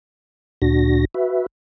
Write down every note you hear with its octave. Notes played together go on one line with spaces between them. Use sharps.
D2 A#2 D4 F#4 A#6
F#4 B4 E5